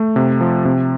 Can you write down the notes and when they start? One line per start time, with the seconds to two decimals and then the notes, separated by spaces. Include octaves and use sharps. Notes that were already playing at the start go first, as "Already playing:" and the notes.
Already playing: A3
0.16 C3
0.41 F3
0.65 C3